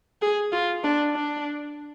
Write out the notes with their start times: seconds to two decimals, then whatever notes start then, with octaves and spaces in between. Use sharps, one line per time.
0.22 G#4
0.52 F4
0.84 D4
1.14 D4